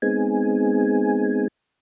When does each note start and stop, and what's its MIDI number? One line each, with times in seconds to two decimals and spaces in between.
0.02 1.48 56
0.02 1.48 59
0.02 1.48 60
0.02 1.48 63
0.02 1.48 68
0.02 1.48 80